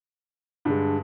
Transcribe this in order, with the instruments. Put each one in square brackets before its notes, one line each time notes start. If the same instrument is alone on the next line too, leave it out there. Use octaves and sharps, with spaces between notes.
[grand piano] G2 D3 G#3